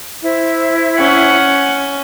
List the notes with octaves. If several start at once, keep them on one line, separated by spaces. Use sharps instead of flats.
E4 C5 E5
C#4 F#5